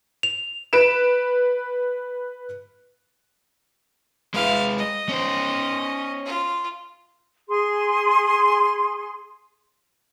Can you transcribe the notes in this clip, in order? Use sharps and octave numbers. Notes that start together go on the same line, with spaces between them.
F7
B4 D7 E7
G#3 E4 B4 F5
D#5
C#4 C5
F4
G#4 C6